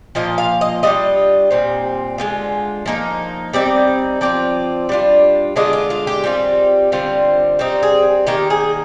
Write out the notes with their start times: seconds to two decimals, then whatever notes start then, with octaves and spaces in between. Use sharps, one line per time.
0.15 A#2 F3 A#3 F4 D#5
0.38 F5
0.61 D#5
0.83 G3 D4 F4 D#5
1.51 A#2 G3 C4
2.18 D3 G#3 C4 F4
2.86 F3 A#3 D#4
3.53 G3 C4 D#4 D5
4.21 F3 C4 F4 D5
4.89 G3 D4 F4
5.56 D3 G#3 D4 F4 D#5
5.73 F4
5.90 F4
6.07 G4
6.24 G3 C4 F4
6.92 D3 G3 C4 F4
7.59 G3 C4 D#4
7.83 G#4
8.27 D#3 A#3 D#4 G4
8.50 G#4